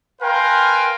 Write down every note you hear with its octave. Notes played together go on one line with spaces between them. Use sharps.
A#4 B4 F5 G5 G#5 C6